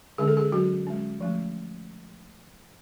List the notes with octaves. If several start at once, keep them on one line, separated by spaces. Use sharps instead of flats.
D3 G#3 C#4 G#4
A4
G#4
F#3 C#4 F#4
G#3 C#4
F3 A3 C#4